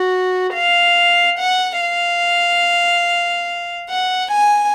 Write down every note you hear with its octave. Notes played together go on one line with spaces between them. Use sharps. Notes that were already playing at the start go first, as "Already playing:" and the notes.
Already playing: F#4
F5
F#5
F5
F#5
G#5